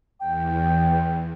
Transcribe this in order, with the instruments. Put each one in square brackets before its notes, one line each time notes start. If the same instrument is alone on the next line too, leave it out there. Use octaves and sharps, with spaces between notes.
[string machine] E2 [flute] G5